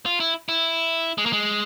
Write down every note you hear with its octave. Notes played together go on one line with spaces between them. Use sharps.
F4
E4
E4
G#3
A#3
G#3